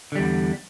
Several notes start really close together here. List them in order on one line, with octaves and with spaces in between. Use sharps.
D3 G3 E2